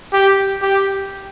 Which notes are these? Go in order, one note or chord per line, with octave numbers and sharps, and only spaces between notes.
G4
G4